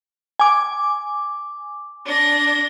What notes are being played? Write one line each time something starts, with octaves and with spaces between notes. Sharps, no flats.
G#5 D6
D4 A#6